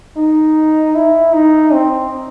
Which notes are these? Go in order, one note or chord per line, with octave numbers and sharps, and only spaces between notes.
D#4
E4
D#4
C4